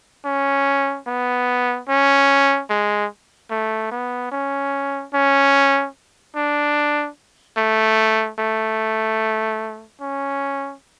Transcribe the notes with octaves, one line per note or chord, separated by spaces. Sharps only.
C#4
B3
C#4
G#3
A3
B3
C#4
C#4
D4
A3
A3
C#4